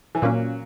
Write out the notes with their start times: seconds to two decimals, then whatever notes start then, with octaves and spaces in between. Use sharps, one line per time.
0.15 E3
0.22 A#2 F#3 A#3 C#4